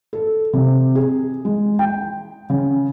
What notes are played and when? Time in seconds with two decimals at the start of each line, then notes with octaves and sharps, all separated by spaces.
0.13 A4
0.53 C3
0.95 G#4
1.45 G#3
1.79 G5
2.50 C#3